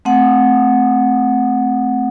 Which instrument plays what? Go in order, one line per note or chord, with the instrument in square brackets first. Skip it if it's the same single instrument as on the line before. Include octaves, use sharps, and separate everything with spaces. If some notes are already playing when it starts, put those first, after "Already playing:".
[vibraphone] A3 C4 F#5